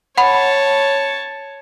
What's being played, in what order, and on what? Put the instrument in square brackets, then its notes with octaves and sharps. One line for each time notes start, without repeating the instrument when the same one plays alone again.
[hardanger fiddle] C#5 A5 [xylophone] F#5 B5